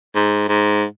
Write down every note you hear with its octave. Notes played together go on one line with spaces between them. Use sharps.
G#2
G#2